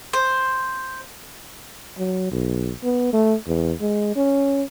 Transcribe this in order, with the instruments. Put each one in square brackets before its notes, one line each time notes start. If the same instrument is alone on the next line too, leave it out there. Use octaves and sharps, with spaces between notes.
[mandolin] C5
[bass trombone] F#3
B1
B3
A3
E2
G#3
C#4